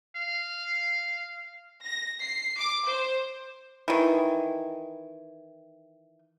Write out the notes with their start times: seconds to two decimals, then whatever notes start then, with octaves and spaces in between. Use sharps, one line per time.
0.16 F5
1.84 A#6
2.22 C7
2.57 D6
2.86 C5
3.88 D#3 E3